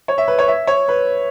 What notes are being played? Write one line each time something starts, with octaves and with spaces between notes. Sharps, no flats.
C#5
E5
B4
C#5
E5
C#5
B4